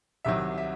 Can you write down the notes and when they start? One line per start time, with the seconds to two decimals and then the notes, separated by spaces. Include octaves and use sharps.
0.25 C2 C3 D#3 F#3 E5
0.58 E5